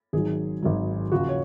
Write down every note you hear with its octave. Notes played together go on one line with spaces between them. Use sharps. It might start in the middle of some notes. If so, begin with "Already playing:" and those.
G#1 G#2 D#3 F#3 G#4
G#1 G#2 D#3 F#3
D#2 C#3 F3 F#4
C#5